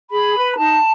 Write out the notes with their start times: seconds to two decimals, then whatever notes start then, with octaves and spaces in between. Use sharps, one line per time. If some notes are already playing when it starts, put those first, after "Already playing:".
0.10 G#4 B5
0.35 B4
0.58 D#4 A5